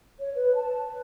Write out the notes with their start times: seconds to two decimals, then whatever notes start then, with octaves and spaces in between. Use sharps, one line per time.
0.19 C#5
0.34 B4
0.56 A5
0.87 B4